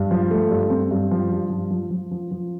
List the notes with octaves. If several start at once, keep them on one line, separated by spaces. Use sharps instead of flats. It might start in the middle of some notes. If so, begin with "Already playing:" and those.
Already playing: G2
F3
A3
G2
C4
G2
F3
G2
F3
F3
F3
F3
F3